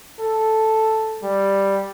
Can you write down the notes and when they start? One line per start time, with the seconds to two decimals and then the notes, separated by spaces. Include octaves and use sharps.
0.21 A4
1.24 G3